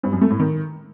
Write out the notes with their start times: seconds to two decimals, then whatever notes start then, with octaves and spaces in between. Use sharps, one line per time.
0.03 G2
0.12 F#2
0.21 A3
0.30 A2
0.39 D#3